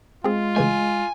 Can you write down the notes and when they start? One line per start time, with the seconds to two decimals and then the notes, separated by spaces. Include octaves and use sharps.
0.24 G#3 C4 F4 G#4
0.56 C#3 E3 A3 G#5